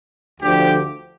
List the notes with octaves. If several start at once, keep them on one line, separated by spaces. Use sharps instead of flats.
D2 D3 F3 G4